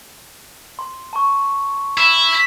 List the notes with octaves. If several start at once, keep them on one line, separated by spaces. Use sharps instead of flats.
C6
A5 C#6
E4 E6 E7 F#7